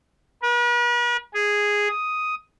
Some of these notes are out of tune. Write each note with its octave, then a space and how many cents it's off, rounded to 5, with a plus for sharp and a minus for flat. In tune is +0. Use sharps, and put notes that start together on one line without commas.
B4 -45
G#4 -5
D#6 +5